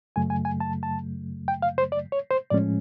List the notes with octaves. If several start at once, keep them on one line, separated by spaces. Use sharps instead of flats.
F#2 C#3 F#3 A3 G#5
G#5
G#5
A5
A5
G5
F5
C5
D5
C#5
C5
A2 F3 G#3 C#4 D5